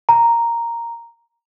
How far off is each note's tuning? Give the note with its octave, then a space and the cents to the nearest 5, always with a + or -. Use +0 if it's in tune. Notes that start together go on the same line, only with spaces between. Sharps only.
A#5 +0